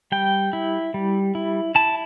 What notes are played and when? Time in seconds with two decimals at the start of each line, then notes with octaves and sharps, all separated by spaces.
0.12 G3 G5
0.53 E4
0.94 G3
1.35 E4
1.75 E4 A5